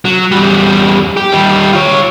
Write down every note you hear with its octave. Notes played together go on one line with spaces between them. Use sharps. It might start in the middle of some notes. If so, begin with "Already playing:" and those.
F#3
E2 G3
G4
D#3 G3
F4 C#5